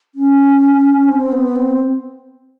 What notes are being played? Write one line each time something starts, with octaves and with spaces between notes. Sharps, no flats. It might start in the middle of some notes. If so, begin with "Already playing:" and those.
C#4
C4
B3
C4